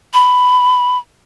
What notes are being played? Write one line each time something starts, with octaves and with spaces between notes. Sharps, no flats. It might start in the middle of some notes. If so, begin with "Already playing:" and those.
B5